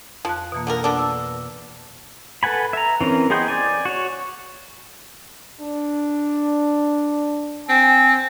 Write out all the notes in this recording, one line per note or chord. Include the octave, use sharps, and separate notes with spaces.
F2 F3 A5 F#6
B2 E3 A#3
D3 F3 A#4
B3 D4 A4 D6
E6
A4 B4 F#5 G#5 B5
E5 A#5
E3 C4 C#4 A#4
B3 G#4 C5 D#5 G5
D5 G#5
F#4 C#5
D4
C4 G#5